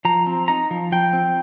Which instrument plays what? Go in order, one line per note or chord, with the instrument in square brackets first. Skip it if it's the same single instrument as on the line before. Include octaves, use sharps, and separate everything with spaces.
[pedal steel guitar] F3 A#5
C4
D#4 A#5
F3
F3 G5
C4